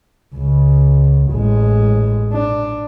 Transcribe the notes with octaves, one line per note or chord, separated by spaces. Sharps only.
C#2
A1 G#3
D4